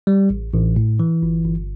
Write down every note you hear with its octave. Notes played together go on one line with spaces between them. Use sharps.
G3
A1
A1
A2
E3
G1
G1